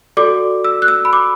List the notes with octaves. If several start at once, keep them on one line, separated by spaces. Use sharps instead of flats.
F#4 A4 D5 D6
E6
F#6
E6
B5
D6